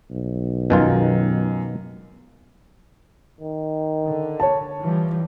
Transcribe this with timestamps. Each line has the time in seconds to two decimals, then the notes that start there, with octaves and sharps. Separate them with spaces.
0.11 B1
0.70 F#2 B2 D#3 F4
3.41 D#3
4.07 D3
4.40 C#5 A5
4.80 E3 F3 G3